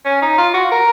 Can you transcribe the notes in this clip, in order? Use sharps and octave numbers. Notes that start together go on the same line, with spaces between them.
C#4
D#4
F4
F#4
A#4